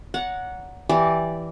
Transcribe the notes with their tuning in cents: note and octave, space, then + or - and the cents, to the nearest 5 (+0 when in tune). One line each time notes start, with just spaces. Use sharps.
C#5 +45 F#5 -10 A#5 +0
E3 +0 G4 +0 D5 +0